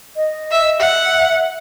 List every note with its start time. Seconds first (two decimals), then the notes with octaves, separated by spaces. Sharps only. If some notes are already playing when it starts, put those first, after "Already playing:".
0.16 D#5
0.51 E5
0.80 E5 F#5